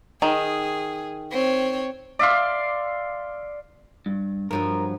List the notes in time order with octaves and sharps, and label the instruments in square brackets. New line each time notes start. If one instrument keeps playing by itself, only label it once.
[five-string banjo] D#3 [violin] G#4
[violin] C4 C#5
[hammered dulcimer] D5 E5 F5 C6
[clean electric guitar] G2
[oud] G2 F3 F#3 [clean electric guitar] A#4